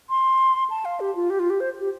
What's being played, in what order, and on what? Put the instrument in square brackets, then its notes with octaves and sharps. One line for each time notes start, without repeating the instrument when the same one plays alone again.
[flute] C6
A5
F5
G4
F4
G4
F4
G4
C5
G4